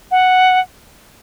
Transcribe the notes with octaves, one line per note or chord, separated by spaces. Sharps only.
F#5